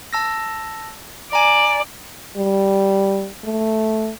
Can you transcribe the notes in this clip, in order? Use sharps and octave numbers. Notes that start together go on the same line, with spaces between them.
A5 E6 A#6
D5 G#5 A#5
G3
A3